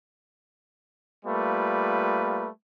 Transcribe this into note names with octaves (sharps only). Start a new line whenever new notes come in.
G3 A3 A#3 F4 B4